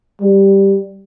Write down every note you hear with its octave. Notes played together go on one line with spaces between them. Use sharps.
G3